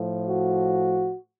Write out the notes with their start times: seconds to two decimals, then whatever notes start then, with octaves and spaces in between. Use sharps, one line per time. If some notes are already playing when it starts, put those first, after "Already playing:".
Already playing: A2 F3
0.26 F#4